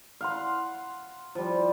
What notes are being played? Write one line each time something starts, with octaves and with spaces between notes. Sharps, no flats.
F5 F#5 C6
F3 G3